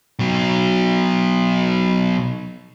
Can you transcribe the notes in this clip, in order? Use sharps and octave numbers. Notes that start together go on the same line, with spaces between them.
B2 F#3